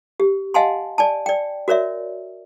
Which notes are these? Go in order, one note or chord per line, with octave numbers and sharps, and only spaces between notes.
G4
D#5 F5 F#5 G#5 A5 C6
D5 G#5 A5
D5 G5
F#4 A#4 C#5 D5 E5